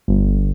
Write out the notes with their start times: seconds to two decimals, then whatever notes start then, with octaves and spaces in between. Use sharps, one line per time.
0.08 G1